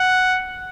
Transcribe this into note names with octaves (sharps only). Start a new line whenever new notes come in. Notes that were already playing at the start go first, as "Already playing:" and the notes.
Already playing: F#5